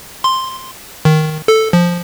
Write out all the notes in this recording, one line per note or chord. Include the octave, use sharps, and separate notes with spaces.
C6
D#3
A4
F3